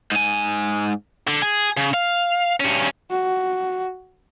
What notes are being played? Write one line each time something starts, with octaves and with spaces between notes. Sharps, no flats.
G#2 G#5
D3
G#4
C#3
F5
G2 C#4
F#4